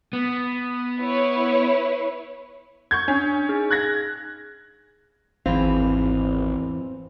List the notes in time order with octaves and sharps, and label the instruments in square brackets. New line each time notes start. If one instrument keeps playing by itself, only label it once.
[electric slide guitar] B3
[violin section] E4 B4 C#5
[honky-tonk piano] C#6 G6 G#6
[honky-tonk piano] C#4 [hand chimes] D4
[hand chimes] D#4 G#4 F6
[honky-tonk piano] F#6 G#6 A#6
[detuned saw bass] G#1 [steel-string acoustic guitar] E2 E3 F5 [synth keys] C4